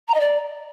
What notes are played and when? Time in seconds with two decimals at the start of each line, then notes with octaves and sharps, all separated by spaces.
0.08 A#5
0.14 D#5
0.20 D5